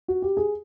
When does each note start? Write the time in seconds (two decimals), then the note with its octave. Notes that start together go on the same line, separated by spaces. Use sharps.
0.08 F#4
0.22 G4
0.37 G#4